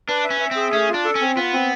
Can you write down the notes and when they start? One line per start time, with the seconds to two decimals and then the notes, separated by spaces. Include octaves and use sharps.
0.09 D4 B4
0.24 E5
0.30 C#4
0.40 E5
0.51 C4 G#4
0.72 A3 C#4
0.89 F4
0.94 D4
1.05 A4
1.15 C#4
1.21 C4
1.36 B3 F4
1.53 C4